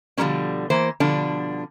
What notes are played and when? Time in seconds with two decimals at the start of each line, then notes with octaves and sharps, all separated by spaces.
0.17 B2 D3 F3 G3 A#3 C#4
0.70 E3 A#3 C5
1.00 B2 D3 F3 G3 D4